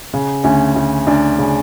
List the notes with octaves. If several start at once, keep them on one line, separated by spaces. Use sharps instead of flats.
C#3
D2 C#4
D2
D2 D4
C#3